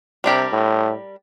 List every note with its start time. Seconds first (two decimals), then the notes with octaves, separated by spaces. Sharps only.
0.24 C3 G3 D4 G4 A#4
0.52 A2